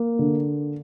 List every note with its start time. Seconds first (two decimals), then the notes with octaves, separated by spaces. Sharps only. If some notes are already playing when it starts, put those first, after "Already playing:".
Already playing: A#3
0.19 D3